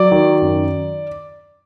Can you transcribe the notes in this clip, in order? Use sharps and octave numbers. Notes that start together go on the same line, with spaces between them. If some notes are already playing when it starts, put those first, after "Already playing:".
Already playing: F#3 D5
D#3
F#2